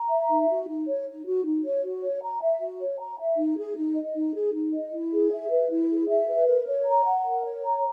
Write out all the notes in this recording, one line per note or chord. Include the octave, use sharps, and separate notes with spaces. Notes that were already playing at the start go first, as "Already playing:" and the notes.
Already playing: A#5
E5
D#4
F#4
D#4
C#5
D#4
F#4
D#4
C#5
F#4
C#5
A#5
E5
F#4
C#5
A#5
E5
D#4
G#4
D#4
D#5
D#4
G#4
D#4
D#5
E4
G#4
E5
B4
E4
G#4
E5
B4
A#4
C#5
A#5
F#5
A#4
C#5
A#5